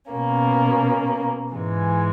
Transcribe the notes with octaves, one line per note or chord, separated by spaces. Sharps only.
B2 A#3 C#4
G#2 E3 G#3